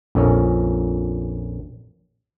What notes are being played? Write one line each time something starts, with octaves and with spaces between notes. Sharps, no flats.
A#1 F2 A#2 C#4